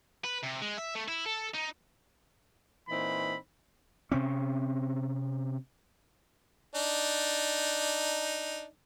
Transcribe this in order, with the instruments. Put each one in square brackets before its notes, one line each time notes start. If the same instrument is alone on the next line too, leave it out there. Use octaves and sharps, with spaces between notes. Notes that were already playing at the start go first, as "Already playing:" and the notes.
[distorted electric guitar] B4
C3
G#3
E5
A3
E4
A4
D#4
[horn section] A#2 E3 C4 D#4 B5
[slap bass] C3 C4 C#4
[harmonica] D4 D#4